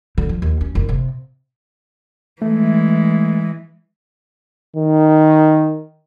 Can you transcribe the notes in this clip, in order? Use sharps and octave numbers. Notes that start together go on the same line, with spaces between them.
D3
F3
D#2
C#4
F#1
C3
E3 G#3 A3
D#3